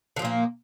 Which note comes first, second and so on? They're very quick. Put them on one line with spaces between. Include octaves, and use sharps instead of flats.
D3 F3 A#2 A#3